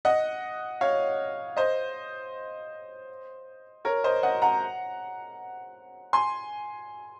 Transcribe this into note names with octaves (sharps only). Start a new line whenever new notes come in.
D#5 F#5
C#5 F5
C5 D#5
A#4 C#5
C5 D#5
D#5 F#5
F#5 A#5
G#5 C6